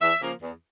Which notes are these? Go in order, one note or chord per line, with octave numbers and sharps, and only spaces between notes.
E2 E5
C#3 F3 A#3
E2